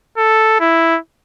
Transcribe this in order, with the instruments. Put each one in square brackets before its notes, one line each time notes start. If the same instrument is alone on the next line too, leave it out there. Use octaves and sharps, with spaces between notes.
[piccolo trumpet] A4
E4